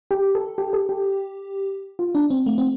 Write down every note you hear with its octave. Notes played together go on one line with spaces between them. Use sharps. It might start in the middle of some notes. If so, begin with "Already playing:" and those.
G4
A4
G4
A4
G4
F4
D4
C4
A3
C4